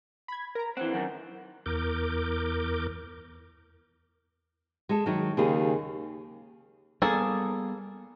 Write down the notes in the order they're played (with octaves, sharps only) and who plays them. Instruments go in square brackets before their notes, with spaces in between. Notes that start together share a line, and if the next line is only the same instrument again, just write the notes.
[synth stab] B5 G#6
A#4 A#5
[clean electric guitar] E3 C4 [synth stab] F#5
[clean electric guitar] F#2 D#3
[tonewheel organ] E2 A#4 D6 G6
[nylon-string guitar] G#3 A4
D#3 F#3 D#4
[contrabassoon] D#2 [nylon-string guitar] C#3 G4 G#4
[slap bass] G3 G#3 B3 [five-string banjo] A#3 G#4 A4